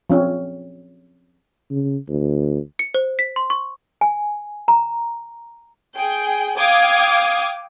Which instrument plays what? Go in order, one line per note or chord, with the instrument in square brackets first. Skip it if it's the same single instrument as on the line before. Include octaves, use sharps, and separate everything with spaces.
[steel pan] F3 C4 C#4
[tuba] C#3
D2
[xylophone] C#7
C5
B6
C6
C#6
[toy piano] G#5
A#5
[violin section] G#4 G5
F5 G5 D6 D#6 G#6